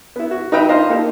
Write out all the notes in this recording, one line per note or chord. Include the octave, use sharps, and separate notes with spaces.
B3 E4
F#4
D#4 B4 E5 G5 A#5 B5
D4 F4 C5 D#5 F5
A#3 D#4 G4 A4